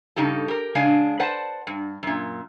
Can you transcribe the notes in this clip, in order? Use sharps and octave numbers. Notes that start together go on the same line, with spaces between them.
G2 C#3 D#4 G4 A4
G4 A#4
C#3 G#3 D4 F5 G#5
B4 C5 D5 F#5 A5
G2
F#2 A#2